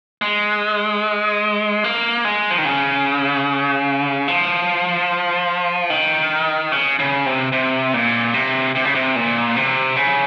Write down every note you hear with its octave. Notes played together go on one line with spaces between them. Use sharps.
G#3
A#3
G#3
F3
D#3
C#3
F3
D#3
C#3
C#3
C3
C3
A#2
C3
C3
C#3
C3
A#2
C3
C#3